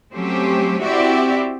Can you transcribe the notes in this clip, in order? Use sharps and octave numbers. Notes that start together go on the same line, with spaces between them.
F#3 A3 C4 C#4 G4 C5
C4 E4 F#4 G4 D5 E5